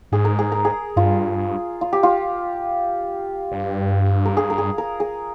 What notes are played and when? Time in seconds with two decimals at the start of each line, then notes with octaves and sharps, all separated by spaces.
0.12 G#2 G#4
0.25 A#4
0.39 G#4
0.52 A#4
0.65 G#4
0.96 G2 F4
1.81 F4
1.93 G4
2.03 F4
3.52 G2
4.25 A#4
4.37 G#4
4.50 A#4
4.58 G#4
4.78 A#4
5.00 G#4